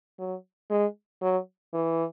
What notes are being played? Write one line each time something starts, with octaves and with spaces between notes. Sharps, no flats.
F#3
G#3
F#3
E3